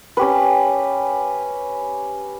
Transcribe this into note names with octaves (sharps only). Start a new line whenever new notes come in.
C#4 G4 B4